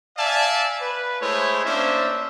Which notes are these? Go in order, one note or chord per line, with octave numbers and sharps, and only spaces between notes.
D5 E5 F5 G#5 A5
B4
G#3 A3 E4 C5 C#5
A#3 C#4 D4 C5 E5